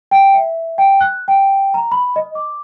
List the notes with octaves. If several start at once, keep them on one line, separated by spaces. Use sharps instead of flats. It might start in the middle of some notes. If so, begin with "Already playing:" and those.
G5
E5
G5
F#6
G5
A#5
B5
D#5
D6